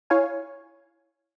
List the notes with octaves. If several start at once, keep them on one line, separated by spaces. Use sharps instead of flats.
E4 C#5 F5 G#5